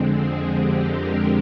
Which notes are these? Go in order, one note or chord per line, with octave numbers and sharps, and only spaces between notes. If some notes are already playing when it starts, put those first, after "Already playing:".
Already playing: F2 D3 G#3 C4
G#4
G4
G4 A#4